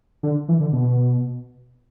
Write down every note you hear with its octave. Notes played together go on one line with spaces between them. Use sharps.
D3
E3
D3
B2